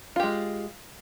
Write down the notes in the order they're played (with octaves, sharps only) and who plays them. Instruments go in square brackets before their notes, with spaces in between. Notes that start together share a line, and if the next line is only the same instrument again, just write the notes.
[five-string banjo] F4
G4
G#3